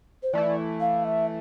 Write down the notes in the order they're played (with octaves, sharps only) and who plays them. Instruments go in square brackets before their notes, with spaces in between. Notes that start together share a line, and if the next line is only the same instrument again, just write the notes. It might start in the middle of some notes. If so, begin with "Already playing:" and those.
[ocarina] C5
[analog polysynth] E3 A3 E4 [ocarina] D5
[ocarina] F5
E5